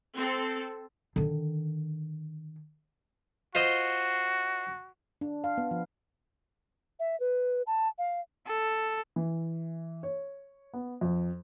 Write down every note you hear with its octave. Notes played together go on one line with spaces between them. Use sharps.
C4 A4
D3 D#3
F4 F#4 C5 D#5
D4
F5
B3
F3
E5
B4
A5
F5
A4
E3
C#5
B3
F2